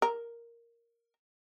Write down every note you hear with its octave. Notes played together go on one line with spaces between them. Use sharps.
A#4